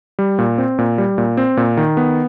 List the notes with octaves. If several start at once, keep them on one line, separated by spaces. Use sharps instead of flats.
G3
A#2
C4
A#2
G3
A#2
C4
A#2
D#3
B3